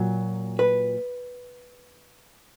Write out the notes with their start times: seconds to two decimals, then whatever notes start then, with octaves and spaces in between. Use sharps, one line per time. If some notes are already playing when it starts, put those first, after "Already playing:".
Already playing: A#2 F#3
0.59 B4